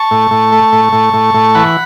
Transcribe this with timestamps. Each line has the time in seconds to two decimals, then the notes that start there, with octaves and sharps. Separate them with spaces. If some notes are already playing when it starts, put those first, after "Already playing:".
Already playing: A5 C#6
0.11 A2
0.31 A2
0.52 A3
0.72 A2
0.93 A2
1.13 A2
1.34 A2
1.55 E3 F#5 B5